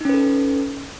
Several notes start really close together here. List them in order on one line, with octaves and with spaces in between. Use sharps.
D#4 C#4 B4 A4